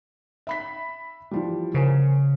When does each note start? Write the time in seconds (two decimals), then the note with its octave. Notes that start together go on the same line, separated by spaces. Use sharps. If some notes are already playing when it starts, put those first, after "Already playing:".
0.47 E5 B5 B6
1.31 E3 F3 G3
1.74 C#3 A#4 C5 G#5